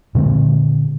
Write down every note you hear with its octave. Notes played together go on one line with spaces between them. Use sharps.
A#2 D3 G#3 C4